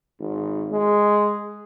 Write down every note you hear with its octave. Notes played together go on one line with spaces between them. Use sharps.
G#1
G#3